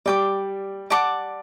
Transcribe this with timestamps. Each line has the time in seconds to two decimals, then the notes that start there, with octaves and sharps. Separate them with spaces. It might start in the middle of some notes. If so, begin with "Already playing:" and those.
0.06 G3 D5 G5 D6
0.90 D5 F#5 A5 D6